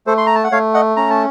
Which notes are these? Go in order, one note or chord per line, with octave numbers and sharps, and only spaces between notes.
A3 A4 C5
C6
A#5
A5
F#5
A3 C#5 F5
D#5 F#5
C#4 A#5
A5